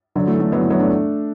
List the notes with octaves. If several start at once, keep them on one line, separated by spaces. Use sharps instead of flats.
D3 F#3
E3 A3
A3 D4
F#3 B3
E3 A3
F#3 B3
A3 D4